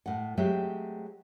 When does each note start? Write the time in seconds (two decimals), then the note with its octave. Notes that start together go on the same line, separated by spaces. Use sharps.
0.06 A2 F#5
0.37 F#3 G#3 A3 C4 G4 E5